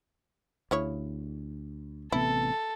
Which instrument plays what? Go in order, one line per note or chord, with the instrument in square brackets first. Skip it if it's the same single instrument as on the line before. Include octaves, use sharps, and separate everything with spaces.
[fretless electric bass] D2 [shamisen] C#3 E4 C#5
[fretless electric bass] A1 C3 B3 [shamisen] E4 [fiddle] A4